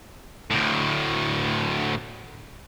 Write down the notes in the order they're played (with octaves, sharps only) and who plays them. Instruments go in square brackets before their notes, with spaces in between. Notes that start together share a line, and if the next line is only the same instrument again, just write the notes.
[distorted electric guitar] D2 A2